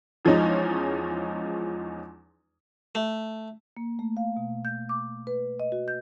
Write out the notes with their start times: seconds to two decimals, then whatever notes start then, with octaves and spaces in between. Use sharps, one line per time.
0.25 E2 F3 G#3 C#4 D#4
2.95 A3
3.77 A#3
3.99 A3
4.17 F5
4.37 B2
4.65 G6
4.89 D6
5.27 B4
5.60 D#5
5.72 F#4
5.88 G6